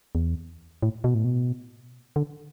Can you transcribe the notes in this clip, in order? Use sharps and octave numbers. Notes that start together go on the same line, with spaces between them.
E2
A2
B2
A2
B2
D3